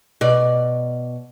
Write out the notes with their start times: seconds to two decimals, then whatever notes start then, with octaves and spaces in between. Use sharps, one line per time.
0.21 B2 D5